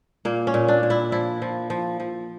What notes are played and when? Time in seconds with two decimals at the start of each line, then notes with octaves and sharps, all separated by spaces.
0.25 A#2 A#3
0.47 C#4
0.54 A#2
0.68 D4
0.83 A#2
0.90 E4
1.12 F3 E4
1.42 F3
1.70 F3
2.00 F3